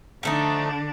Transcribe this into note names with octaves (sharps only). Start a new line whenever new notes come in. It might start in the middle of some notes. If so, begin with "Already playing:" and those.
D3 F3 A3 D4 D#4